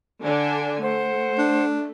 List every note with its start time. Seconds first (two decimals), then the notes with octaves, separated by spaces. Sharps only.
0.22 D3 D4 G#5
0.82 A3 C5 F#5
1.38 D4